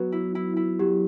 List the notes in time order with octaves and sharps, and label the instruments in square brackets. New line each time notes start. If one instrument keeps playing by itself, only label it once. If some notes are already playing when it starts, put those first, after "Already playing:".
Already playing: [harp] F#3 B3 [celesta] F#4
[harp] E4
E4
E4
[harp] F#3 [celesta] G4